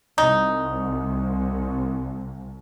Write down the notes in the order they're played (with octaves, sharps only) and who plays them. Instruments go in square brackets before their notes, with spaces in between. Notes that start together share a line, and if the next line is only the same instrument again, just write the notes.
[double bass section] C2 [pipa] D#4